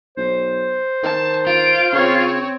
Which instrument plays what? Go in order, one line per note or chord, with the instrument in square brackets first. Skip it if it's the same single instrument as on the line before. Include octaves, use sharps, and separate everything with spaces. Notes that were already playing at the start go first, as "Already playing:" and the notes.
[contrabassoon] B1 [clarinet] C5
[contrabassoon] D#3 [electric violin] A5
[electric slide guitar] F4 [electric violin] D7
[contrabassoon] C#3 [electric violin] C4 C#5